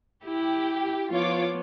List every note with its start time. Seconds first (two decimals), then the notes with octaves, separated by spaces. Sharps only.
0.25 E4 G4
1.11 F3 B3 F4 C#5 D6